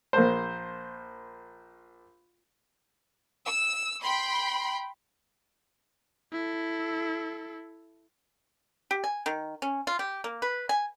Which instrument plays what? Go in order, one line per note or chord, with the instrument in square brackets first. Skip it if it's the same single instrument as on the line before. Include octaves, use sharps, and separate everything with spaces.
[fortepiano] A#1 A#3 C5
[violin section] E6
G5 B5 C6
[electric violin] E4 A4
[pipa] G4
G#5
D#3
C#4
F4
G4
A#3
B4
G#5